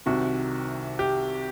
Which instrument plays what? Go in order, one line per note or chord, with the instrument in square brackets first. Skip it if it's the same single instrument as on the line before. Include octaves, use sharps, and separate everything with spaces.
[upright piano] C2 C3 D#3 F#4
G4